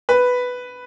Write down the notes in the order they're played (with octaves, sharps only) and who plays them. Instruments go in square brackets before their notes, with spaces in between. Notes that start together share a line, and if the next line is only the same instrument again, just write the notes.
[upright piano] B4